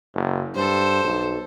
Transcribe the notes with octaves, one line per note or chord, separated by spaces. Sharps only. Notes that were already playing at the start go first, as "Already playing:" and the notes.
F#1
G2 A4 C5
B1